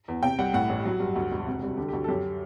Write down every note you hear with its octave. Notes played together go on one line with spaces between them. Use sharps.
E2
C3 G5
C2 F#5
A2 F#5
A1
F#3
G2
D2
E1
C3
C2
D3 G4
G4
D2
A4
F#2 G4